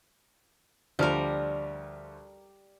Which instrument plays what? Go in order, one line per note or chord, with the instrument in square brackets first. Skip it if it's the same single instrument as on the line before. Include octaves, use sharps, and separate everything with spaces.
[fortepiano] D2 F3 F6 [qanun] G3 A#4